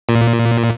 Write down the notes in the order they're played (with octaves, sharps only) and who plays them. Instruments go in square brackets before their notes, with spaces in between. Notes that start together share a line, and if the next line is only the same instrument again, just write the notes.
[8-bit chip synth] A#2